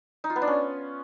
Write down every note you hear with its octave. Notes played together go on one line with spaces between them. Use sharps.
D#4
F4
B3
D4
C#4